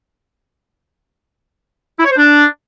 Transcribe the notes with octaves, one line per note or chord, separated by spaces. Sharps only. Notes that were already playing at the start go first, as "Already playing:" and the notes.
E4
C#5
C5
D4